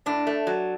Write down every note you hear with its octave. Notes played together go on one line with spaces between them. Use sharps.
A2 D4
A3
F#3